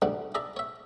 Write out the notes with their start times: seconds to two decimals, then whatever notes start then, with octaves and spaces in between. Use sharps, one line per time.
0.02 D2 G#2 G3 D4 F#5
0.35 G#4 D5 E5 A5 A#5
0.57 C#5 E5